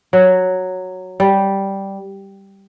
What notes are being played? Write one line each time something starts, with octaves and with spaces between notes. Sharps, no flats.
F#3
G3